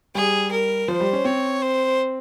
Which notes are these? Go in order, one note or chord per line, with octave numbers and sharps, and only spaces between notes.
G3 G#4
A#4
F3 C5
G3
C#4
C4 C#5
C5